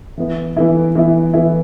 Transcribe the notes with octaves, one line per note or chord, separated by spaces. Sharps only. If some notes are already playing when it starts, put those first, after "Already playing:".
E3 B3 E4
E3 B3 E4
E3 B3 E4
E3 B3 E4